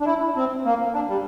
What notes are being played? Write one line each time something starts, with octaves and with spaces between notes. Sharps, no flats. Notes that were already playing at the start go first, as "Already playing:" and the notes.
D4
E4
C4
A#3
D4
G3